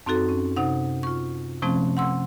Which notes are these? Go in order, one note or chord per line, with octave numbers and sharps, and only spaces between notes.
F#2 C4 D#4 F#4 A4
C#4
C3 D#4 F#5
F4 C#6
C3 F3 A3 C4 C#4
F#5 C6 E6